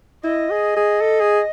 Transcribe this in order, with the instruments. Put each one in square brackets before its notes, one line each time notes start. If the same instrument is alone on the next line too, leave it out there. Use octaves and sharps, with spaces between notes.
[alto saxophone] E4 [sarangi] D#5
[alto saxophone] G#4
G#4
A4
G#4